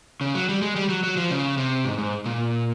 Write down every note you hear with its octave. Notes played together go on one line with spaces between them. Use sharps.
C#3
F#3
G3
G#3
G3
F#3
F#3
F3
C#3
C3
G#2
G#2
A#2